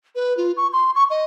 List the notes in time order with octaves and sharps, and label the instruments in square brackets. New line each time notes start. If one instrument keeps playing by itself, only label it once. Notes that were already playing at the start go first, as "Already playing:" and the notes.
[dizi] B4
F4
C#6
C6
C#6
D#5